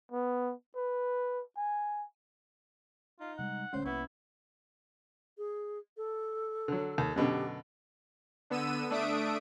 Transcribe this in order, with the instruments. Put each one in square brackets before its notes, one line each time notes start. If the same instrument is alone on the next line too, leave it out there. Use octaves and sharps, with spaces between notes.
[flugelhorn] B3
B4
G#5
[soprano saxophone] D#4 [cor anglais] F4
[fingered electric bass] C3 G3 G#3 [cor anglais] F#5
[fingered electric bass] D1 D2 G#3 [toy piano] C#4 C#5 [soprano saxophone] C5
[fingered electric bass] C2 A#3 [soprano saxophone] B3 [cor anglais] E4 [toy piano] C#6
[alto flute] G#4
A4
[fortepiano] D3 F#3
D#2
[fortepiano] F#2 B2 D3 [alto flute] G4
[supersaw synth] D3 B3 E6 D#7
A3 D4 E5 D#6 D7